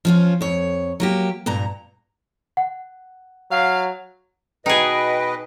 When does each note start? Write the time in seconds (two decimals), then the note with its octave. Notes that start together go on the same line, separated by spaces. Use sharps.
0.05 F3 C#4 F4
0.41 F2 C#5
1.00 F#3 A#3 G4
1.46 G2 A#2 A#5
2.57 F#5
3.51 F#3 F5
4.66 B2 D#4 G#4 B4 D#5 G5